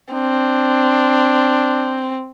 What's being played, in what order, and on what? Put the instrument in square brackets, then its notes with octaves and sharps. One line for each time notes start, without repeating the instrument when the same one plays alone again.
[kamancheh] C4 [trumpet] D4